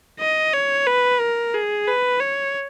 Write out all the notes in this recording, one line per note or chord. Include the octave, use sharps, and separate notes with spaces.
D#5
C#5
B4
A#4
G#4
B4
C#5